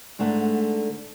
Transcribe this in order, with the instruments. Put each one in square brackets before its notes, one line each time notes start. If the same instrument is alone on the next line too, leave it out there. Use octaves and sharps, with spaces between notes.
[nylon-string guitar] G#2 D3 A3 F#5